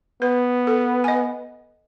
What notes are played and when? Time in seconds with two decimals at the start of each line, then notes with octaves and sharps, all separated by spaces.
0.22 B3 B4
0.67 A4
1.04 D#5 G#5